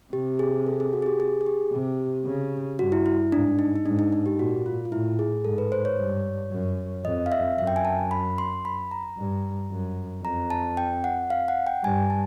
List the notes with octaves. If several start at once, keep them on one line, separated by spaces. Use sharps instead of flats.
C3 G4
G#4
A4
G#4
F#4
G#4
G4
G#4
G#4
G4
C3
C#3
G2 F#4
E4
E4
G#2 D4
D#4
D#4
G#2 D4
D#4
D#4
G4
A#2 F#4
F4
F4
A2 E4
G#4
G#2 A4
B4
C5
C#5
G2
F#2
F2 D#5
F5
E5
F#2 E5
G5
G#5
A5
B5
C6
B5
A#5
G2
F#2
F2 A#5
A5
G5
F#5
F5
F#5
G5
G2 G#5
A5